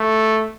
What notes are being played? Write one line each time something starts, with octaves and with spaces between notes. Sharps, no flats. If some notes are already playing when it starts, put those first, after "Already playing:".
Already playing: A3